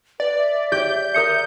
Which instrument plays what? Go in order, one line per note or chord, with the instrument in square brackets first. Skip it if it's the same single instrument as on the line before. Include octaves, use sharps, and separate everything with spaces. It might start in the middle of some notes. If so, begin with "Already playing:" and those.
[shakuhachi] B4 [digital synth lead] D5
[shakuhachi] E5
[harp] G4 D5 [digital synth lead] G6
[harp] A#4 D#6 C#7